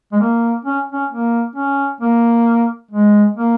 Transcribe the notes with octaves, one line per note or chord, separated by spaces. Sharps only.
G#3
A#3
C#4
C#4
A#3
C#4
A#3
G#3
A#3